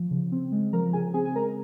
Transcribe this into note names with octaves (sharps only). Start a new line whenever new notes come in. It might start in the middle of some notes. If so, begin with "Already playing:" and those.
Already playing: F3
C#3
C4
G#3
F3 A#4 A#5
C#3 G#4 G#5
C4 G#4 G#5
G#5
G#3 A#4 A#5